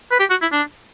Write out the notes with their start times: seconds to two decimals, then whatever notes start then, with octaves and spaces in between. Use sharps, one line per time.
0.11 B4
0.19 G4
0.30 F#4
0.42 E4
0.52 D4